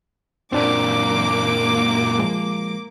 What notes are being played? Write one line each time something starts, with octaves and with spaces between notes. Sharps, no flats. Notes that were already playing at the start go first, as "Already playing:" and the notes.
F#2 A#2 A#3 C4 D4 D5 D6
F3 G#3